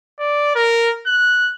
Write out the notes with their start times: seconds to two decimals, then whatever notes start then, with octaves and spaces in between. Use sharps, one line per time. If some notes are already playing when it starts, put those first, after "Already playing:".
0.19 D5
0.56 A#4
1.07 F#6